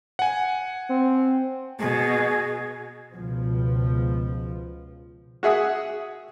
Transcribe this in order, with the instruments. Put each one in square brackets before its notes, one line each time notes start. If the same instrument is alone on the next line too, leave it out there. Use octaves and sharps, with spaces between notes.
[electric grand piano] F#5 G#5
[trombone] C4
[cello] B2 [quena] G#4
[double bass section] C#2 B2 F3
[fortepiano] F#4 G#4 E5 F#5 D#6